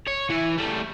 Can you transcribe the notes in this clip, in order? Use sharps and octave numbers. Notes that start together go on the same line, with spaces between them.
C#5
E3 E4
G3 A3